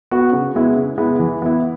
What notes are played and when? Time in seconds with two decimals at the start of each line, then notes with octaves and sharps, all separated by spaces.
0.11 B3 F#4
0.32 C#3
0.55 G#3 B3 E4
0.76 C#3
0.98 G#3 B3 E4
1.19 E3
1.42 B3 E4